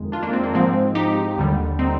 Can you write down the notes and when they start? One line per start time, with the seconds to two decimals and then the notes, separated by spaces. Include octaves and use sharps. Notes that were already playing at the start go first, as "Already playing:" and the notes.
Already playing: F2 D#3 G#3
0.12 D4 F4
0.23 A#3 D4
0.33 C4
0.43 A#3
0.54 G#2 F3 G#3 C4
0.95 D#4 G4
1.37 D#2 D3 G3
1.79 C4 D#4